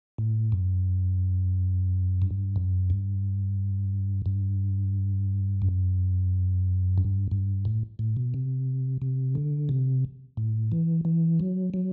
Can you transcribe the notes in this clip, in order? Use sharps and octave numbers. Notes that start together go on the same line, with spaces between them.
A2
F#2
G2
F#2
G2
G2
F#2
G2
G2
A2
A2
B2
C3
C3
D3
C3
A2
E3
E3
F#3
F#3